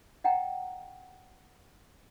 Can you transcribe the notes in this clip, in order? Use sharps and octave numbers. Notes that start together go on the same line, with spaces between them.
D#5 F#5 G5 A#5